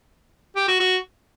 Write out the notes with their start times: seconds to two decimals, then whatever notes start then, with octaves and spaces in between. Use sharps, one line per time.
0.56 G4
0.68 F#4
0.80 F#4